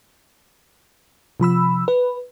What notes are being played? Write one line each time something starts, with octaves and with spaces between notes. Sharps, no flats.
C3 F3 B5 E6
B4